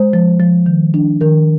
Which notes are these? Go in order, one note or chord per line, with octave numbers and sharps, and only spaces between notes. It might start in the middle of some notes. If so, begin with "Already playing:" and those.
Already playing: G#3 C5
F3
F3
D#3
D4
D#3 A#4